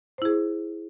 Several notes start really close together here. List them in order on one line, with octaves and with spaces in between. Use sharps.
C5 E4 G#4